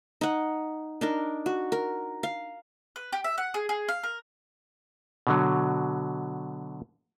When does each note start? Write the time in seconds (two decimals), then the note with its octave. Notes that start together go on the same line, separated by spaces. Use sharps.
0.21 D#4 F#5
1.01 D4 D#4 A#4
1.46 F#4
1.72 A#4
2.23 F5
2.96 B4
3.13 G4
3.24 E5
3.38 F#5
3.54 G#4
3.69 G#4
3.89 F5
4.03 A#4
5.27 B2 D3 F#3